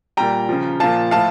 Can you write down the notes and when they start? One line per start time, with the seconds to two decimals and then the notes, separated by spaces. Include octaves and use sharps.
0.17 A#2 G3 G5 A#5
0.49 C#3 F3
0.80 A#2 F3 F5 A5
1.11 A2 F3 F5 A5